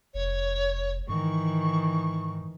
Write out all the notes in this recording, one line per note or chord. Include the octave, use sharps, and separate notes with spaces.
F1 C#5
G#2 D#3 E3 C#6